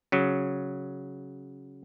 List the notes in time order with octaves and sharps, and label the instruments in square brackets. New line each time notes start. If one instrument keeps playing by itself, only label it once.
[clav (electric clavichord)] C#3 F#3